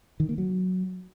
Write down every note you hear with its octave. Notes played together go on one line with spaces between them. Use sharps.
D#3
A#3
F#3